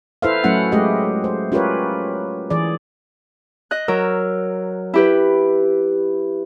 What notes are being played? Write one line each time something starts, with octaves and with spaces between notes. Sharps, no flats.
E4 A4 B4 C5 E5 F5
F#3 A3 C#4 E4 F#5
G#3 A3 G4 D#5
C5
C#4 F4 G4 A#4 B4 C#5
E3 G#4 D5
D#5 F#6
F#3 A#4 E6
E4 G4 B4